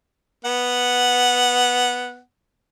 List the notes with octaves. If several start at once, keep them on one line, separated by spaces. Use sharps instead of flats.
B3 F#5